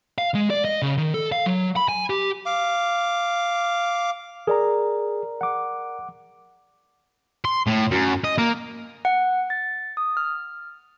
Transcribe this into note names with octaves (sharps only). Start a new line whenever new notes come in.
F5
G#3
D5
D#5
C#3
D#3
A4
F5
F#3
B5
G#5
G4
F5 D6
G#4 A#4 D5 A#5
F#5 D6
C6
A2
F#2
D#5
A#3
F#5
A6
D#6
F6